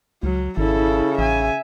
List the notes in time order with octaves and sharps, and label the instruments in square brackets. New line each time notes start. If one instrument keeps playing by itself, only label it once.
[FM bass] C#2 [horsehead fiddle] F#3
[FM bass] G#1 [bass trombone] C#3 [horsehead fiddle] E4 A4
[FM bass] A1 [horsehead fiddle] E5 G#5